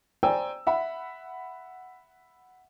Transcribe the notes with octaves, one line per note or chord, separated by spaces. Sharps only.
C5 D5 G5 G#5 A#5 E6
E5 F#5 B5